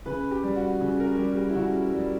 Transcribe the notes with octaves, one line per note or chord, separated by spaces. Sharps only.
C#3 B4
G4
G3
F#4
C#3
A#4
G3 G4
G4
E4
C#3 F#4
G3